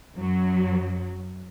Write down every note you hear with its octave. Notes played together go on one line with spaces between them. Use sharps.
F#2 F#3